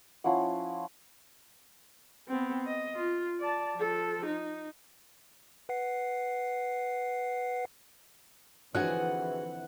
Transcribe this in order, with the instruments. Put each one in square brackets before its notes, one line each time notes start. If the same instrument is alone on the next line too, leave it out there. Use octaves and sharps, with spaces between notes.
[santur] F3 C#4 E4 F#5
[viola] B3 C4
D#5
F4
D5 A5
F3 A4
D#4
[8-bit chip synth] B4 F#5 C7
[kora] D3 F3 C4 [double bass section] E3 [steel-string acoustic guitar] F#4 G#4 G#5 [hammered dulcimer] F#5